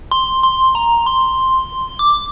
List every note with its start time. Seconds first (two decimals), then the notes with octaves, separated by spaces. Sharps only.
0.11 C6
0.43 C6
0.75 A#5
1.07 C6
1.99 D6